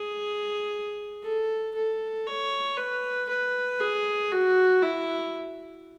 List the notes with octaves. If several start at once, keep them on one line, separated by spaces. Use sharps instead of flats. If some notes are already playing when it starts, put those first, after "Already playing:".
Already playing: G#4
A4
A4
C#5
B4
B4
G#4
F#4
E4